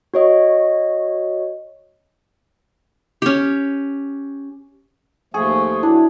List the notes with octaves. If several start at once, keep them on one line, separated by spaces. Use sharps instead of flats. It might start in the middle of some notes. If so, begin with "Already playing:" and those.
F#4 C#5 D#5
C#4 G4
D#2 F3 A3 G#4 C#6
F#3 D4 E4